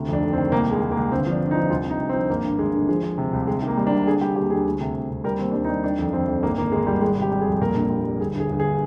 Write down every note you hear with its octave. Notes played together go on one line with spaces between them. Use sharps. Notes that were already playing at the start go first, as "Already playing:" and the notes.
Already playing: D2 C3
F2 D4
D#3
C4
D#3
C2 A#3
C2 G#3
C2
A#3
C2
G1 C4
F3 D4
G2
D#4
F3
C2 F4
C3
D#4
C2
C4
F3
G#1 A#3
G2
G#1 G#3
D3
F3 G#3
F3
C3
C2
C3 G#3
D#3
A#3
G3
D4
C3
D3 G#4
G3 G4
D#2 G4
D3 G#4
D2
C3
C3
C3
G3 A#4
D#2 C4
G3 D4
D#4
G3
D#3 D4
F2
F2 C4
F2
G#1 A#3
G#1 A#3
G#1 G#3
G#1 G3
G3 G#3
C3
G4
G3
G#4
F2
A#2 A#4
A#1
G3
G3
G1 G#4
G1 G#4
G1
G#4